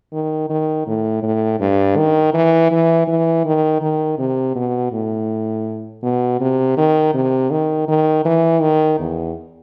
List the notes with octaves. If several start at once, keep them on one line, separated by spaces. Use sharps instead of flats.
D#3
D#3
A2
A2
G2
D#3
E3
E3
E3
D#3
D#3
C3
B2
A2
B2
C3
D#3
C3
D#3
D#3
E3
D#3
E2